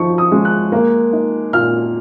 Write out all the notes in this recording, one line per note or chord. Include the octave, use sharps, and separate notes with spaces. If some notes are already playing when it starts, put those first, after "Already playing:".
Already playing: F3 D#4 C#6
D#6
G#3
F#6
A#3
D#4
A#2 F6